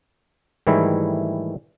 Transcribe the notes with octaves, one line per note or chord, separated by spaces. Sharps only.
G#2 D#3 E3 G3 A3 E4